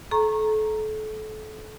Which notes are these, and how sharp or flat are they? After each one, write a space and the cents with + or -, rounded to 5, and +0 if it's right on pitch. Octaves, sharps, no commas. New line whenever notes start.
A4 -30 A#5 +0 C#6 -25